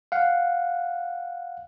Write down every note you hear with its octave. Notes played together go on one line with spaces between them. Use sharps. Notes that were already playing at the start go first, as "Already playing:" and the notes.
F5 F#5